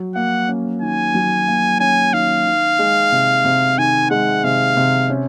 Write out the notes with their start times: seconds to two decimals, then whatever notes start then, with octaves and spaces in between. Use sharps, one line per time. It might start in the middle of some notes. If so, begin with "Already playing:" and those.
Already playing: F#3
0.15 A#3 F#5
0.49 C#4
0.81 D#3 G#5
1.14 F#3
1.48 A#3
1.80 C#4 G#5
2.13 D#3 F5
2.46 D#3
2.79 G#3
3.12 C3
3.45 C3
3.78 D#3 G#5
4.10 G#3 F#5
4.44 C3 F5
4.77 C3
5.10 C#4